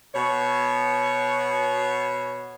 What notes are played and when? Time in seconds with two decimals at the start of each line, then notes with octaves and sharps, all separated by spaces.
0.14 B2 C#5